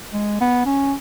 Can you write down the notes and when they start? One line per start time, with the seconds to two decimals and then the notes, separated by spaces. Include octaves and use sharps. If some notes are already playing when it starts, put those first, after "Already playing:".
0.13 G#3
0.40 B3
0.66 C#4